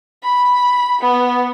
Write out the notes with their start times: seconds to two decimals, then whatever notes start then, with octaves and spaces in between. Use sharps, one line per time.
0.23 B5
1.01 B3